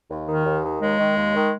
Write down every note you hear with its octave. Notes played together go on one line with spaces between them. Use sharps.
D#2
D#3
D#2
D#3
D#2 G#3
D#3
D#2
D#3